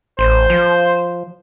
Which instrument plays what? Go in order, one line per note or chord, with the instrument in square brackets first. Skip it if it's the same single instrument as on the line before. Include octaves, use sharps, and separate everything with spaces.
[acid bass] A1 [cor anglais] C5
[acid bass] F3